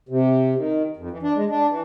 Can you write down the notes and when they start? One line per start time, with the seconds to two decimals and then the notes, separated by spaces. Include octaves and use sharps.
0.09 C3
0.57 D#3
0.97 F2
1.11 E3
1.23 D4
1.36 G#3
1.50 D4
1.69 E3